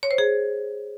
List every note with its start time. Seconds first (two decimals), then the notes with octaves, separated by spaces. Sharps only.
0.03 C#5
0.11 C5
0.18 G#4